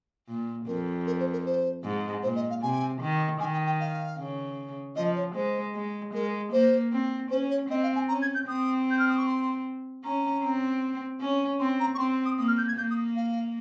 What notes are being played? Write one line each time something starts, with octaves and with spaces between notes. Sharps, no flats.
A#2
F2 A#4
A#4
C5
A#4
C5
G#2
A#2 C5
D#5
F5
C3 G#5
D#3
D#3 G#5
G5
G5
F5
C#3
F3 D#5
C#5
G#3 C5
G#3
G#3 A#4
A#3 C5
C4
C#4 C5
C#5
C4 D#5
F5
G#5
C#4 A#5
G#6
G6
C4 D#6
G6
F6
D#6
C#6
C6
C#4 A#5
C4
C#4
C4 C6
A#5
C#6
C4 C6
D#6
A#3 D#6
F6
G6
G#6
A#3 G6
D#6
F5